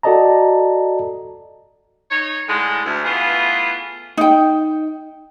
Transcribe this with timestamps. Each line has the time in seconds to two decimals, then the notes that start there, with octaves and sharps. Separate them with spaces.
0.03 F#4 A4 D5 D#5 A5 A#5
2.11 D#4 C#5
2.49 A2 D3 G#3
2.85 D2
3.05 E3 A3 B3 F4 G#4
4.17 D#4 G5